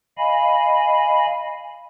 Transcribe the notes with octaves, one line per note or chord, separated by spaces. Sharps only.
D#5 F5 G#5 B5